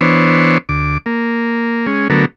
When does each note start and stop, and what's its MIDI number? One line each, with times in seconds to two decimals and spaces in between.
0.01 0.58 52
0.01 0.58 59
0.01 0.58 62
0.01 0.58 72
0.01 0.58 73
0.69 0.98 38
0.69 0.98 86
1.06 1.86 58
1.87 2.08 56
1.87 2.08 61
2.10 2.25 50
2.10 2.25 54
2.10 2.25 57
2.10 2.25 59
2.10 2.25 70